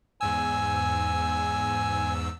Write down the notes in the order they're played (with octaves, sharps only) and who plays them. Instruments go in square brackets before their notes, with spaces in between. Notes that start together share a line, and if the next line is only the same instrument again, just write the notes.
[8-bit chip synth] E2 G#2 E6 [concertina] G#5